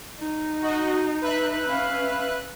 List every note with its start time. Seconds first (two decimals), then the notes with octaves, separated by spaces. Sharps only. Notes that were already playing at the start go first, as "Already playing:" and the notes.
0.19 D#4
0.62 F#4 D#5
1.22 B4 E5 F#6
1.68 C#4 F5